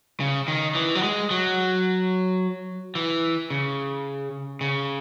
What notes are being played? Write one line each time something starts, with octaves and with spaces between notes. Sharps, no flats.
C#3
D#3
E3
F#3
G#3
F#3
E3
C#3
C#3